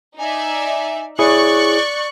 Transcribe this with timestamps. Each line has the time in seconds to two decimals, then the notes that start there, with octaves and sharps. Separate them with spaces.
0.19 D#4 D5 E5 G#5
1.19 E4 G#4 C#5 D5 C#6 F#6